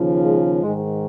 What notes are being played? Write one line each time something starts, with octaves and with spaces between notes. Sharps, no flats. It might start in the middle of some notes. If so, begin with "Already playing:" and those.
Already playing: D#2 C#3 F3
G#3
G#2 D#3 G#3